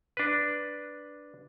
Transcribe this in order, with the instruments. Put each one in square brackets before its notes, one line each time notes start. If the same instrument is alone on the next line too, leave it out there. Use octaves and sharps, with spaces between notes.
[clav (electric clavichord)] D4 B4